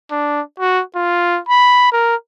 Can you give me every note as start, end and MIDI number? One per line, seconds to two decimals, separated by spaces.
0.11 0.41 62
0.60 0.82 66
0.96 1.40 65
1.49 1.91 83
1.92 2.15 70